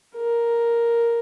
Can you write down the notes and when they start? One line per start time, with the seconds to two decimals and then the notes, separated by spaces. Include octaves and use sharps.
0.16 A#4